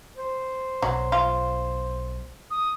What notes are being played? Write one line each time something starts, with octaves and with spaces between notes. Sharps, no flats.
C5
B1 F#3
F4
D#6